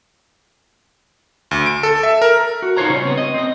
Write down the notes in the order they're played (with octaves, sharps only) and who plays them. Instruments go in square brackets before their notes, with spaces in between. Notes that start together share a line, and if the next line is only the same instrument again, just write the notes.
[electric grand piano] D2
D7
A4
E5
A#4
[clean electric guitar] F#4
D#4 F4 A4 C5 C#5 A#5
C#3 G3 C#5
B3 C4
D#5
C4 D#5